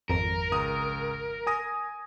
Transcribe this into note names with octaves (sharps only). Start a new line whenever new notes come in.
G#1 F2 A#4
C#2 A#5 D#6
G#5 D#6 A#6